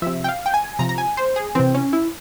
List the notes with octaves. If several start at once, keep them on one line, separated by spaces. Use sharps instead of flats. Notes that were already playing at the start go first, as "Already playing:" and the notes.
C3 F3 E5
G5
F5
G5
G#5
C3 F3 A#5
A#5
G#5
C5
G#4
C3 E3 C4
C#4
E4